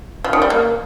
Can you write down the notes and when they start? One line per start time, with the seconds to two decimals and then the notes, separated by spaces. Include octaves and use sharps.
0.24 F3
0.33 D#3
0.42 G3
0.50 A#3